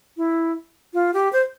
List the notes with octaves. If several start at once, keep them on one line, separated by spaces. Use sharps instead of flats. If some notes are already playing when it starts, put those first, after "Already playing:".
E4
F4
G4
C5